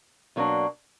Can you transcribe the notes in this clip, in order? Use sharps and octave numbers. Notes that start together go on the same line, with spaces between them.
B2 F#3 A#3 D4